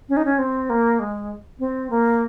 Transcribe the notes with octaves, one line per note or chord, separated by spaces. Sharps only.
C#4
D#4
C#4
C4
A#3
G#3
C4
A#3